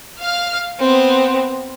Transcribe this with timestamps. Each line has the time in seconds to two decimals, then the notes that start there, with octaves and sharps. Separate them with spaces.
0.19 F5 F6
0.79 B3 C4